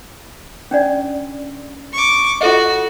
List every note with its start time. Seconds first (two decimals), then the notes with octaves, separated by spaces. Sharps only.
0.71 C#4 D4 D5
1.93 C#6 D6
2.41 F4 F#4 A4 D#5